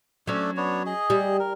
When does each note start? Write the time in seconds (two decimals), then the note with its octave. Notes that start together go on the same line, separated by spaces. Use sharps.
0.27 F#3 A3 C#4 D4
0.57 B3 D4 C#5
0.86 G#4 D#5
1.10 G3
1.40 A#4